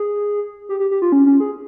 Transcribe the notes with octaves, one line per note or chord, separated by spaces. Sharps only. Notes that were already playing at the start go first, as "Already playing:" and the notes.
Already playing: G#4
G4
G4
G4
F4
C#4
C#4
G#4